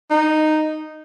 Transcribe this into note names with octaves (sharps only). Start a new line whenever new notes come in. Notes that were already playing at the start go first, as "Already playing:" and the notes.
D#4